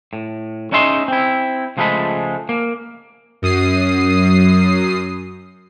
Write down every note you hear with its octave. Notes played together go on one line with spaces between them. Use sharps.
A2
C#4 D#4 G#4 E5 C6
C4 E4
C#2 F3 G#3 A3 A4 B5
A#3
F#2 D#6 C7